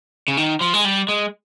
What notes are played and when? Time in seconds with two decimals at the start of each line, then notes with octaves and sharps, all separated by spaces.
0.28 C#3
0.37 D#3
0.61 F3
0.73 G#3
0.85 G3
1.09 G#3